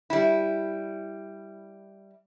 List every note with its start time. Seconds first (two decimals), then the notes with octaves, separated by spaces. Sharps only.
0.10 G3 E4